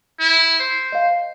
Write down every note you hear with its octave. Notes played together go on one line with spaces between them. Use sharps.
E4
C5
D#5 F5